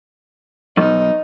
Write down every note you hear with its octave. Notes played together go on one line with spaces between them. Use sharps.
B1 F2 D#4